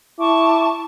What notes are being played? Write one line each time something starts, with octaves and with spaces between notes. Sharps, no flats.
E4 A5 C#6 D6